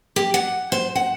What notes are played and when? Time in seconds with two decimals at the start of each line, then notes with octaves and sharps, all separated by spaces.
0.16 G4
0.34 F#5
0.72 C5
0.95 F#5